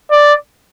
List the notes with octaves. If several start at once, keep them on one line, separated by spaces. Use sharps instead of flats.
D5